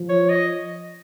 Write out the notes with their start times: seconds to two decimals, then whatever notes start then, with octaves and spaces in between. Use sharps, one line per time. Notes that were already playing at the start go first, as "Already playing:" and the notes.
Already playing: F3
0.09 C#5
0.30 D#5